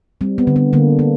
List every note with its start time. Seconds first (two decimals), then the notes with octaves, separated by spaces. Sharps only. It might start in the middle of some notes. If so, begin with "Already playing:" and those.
0.21 G3 C4
0.38 B3
0.47 D3
0.56 B3
0.73 D3 A#3
0.99 A#3